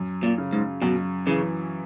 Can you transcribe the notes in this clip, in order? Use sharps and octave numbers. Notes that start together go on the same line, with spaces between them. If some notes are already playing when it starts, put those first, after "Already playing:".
Already playing: F#2
A#2
C#3
G#2
F#2 B2
C#3 E3